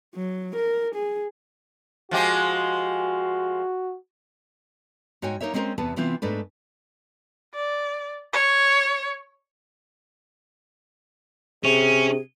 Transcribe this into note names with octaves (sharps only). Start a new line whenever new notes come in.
F#3
A#4
G#4
F3 G#3 F#4 G4
G#2 F#4 C#5 G5 G#5
A#3 D#4 A#4 C#5 E5
G#3 C4 C#4 F#4 A#4 C5
E2 C3 B3 B4 A5
C3 E3 B3 C4 F4
G#2 A3 D4 B4
D5
C#5
C3 C#4 G#4